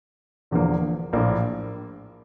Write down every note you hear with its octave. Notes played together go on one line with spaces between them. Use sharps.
E1 E2 D3 F3 A#3
A#1 A2 F3 A#3